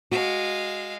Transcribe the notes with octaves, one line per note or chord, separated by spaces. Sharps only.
G#3 F#4 F5